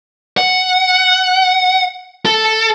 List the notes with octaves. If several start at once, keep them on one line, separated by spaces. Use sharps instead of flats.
F#5
A4